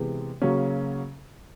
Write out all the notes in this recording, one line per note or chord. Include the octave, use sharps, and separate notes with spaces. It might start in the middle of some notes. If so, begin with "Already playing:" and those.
Already playing: C3 E3 G#3 B3
C#3 F#3 A#3 C#4